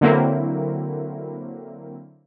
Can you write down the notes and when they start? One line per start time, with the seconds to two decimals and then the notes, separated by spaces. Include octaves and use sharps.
0.01 D3 F#3 A#3 C4 E4